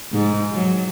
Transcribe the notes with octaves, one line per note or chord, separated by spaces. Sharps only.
G#2
F#3